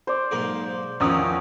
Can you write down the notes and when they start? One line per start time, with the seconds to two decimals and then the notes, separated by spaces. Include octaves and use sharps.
0.07 C5 D5
0.31 B1 G#2 A#3
1.00 E2 D#3 F3 C#4 D#6 E6